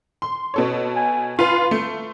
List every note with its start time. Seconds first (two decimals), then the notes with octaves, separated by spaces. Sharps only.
0.22 C6
0.54 B2 A4 C#5
0.96 G#5
1.39 F4 B4 F5 C6
1.71 A3